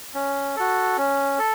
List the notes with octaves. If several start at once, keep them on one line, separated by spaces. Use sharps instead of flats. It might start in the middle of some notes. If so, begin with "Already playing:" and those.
C#4
F#4 A4
C#4
A4